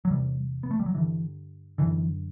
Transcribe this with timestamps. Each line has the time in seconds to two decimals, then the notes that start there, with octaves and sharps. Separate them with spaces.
0.05 F#3
0.10 E2 C3 G3
0.63 B3
0.71 A3
0.79 G3
0.86 F#3
0.95 G2 D3 E3
1.78 F#2 D3 E3